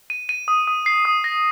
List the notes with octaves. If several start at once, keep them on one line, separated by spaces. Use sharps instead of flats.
D#7
D#7
D#6
D#6
C7
D#6
A#6